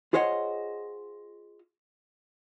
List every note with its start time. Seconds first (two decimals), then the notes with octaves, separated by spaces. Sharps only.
0.13 F4 G#4 C5 C#5 D#5 F#5